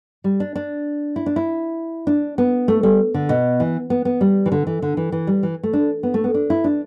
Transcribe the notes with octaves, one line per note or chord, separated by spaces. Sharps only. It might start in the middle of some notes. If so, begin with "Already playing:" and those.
G3
D4
D4
E4
D4
E4
D4
B3
A3
G3
D3
B2
E3
B3
B3
G3
E3
D3
E3
D3
E3
E3
G3
E3
A3
D4
B3
A3
B3
D4
E4
D4